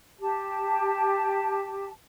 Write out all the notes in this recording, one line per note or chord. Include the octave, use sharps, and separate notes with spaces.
G4 A5